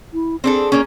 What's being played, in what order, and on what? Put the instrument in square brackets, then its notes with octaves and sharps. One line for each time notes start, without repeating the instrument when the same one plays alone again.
[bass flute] E4
[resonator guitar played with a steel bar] C4 D4 A4 [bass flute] G#4
[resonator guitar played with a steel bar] A#3 C#4